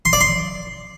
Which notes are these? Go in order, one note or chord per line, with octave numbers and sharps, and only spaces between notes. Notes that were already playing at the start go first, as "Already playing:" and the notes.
C6
D5
C6